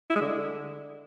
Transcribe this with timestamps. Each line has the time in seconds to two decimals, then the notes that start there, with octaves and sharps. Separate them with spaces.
0.10 E4
0.15 G#3
0.21 D3